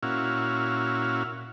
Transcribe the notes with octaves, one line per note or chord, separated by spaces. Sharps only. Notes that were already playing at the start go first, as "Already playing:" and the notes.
A#2 C#4 E4 F#4 F5